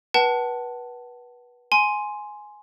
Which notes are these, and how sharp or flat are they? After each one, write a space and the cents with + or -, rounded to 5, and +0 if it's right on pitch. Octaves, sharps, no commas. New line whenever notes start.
B4 -25 F#5 +30 A5 +0
G#5 +10 C6 +0